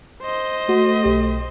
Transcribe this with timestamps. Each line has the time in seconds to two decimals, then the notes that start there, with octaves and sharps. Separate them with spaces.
0.23 C5 D#5
0.69 A3 F#4
1.04 B1 G4